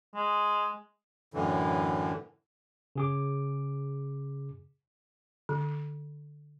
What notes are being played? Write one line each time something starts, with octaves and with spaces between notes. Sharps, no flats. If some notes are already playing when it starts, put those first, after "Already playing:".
G#3
F#2 A2 D3 E3
C#3 G#4 D6
D3